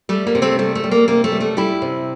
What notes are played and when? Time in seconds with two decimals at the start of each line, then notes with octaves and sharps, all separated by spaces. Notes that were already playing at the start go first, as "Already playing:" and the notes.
0.09 G3 A3
0.27 A#3
0.35 C3
0.42 A3 C4
0.59 G3 A3
0.75 A3
0.84 G3
0.91 A#3
1.08 C3 A#3
1.24 A3
1.32 G3
1.41 A3
1.57 G3 E4 G4
1.82 C3